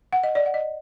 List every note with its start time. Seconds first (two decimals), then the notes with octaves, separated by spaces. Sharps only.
0.13 F#5
0.23 D#5
0.35 D5
0.46 F#5
0.54 D#5